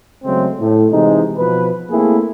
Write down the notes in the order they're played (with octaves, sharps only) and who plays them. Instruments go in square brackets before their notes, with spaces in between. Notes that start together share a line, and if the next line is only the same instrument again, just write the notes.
[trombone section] C#3 F#3 G#3 A3 C4
A2
C3 E3 G#3 D#4
B2 F3 B4
A3 A#3 C4 E4 G#4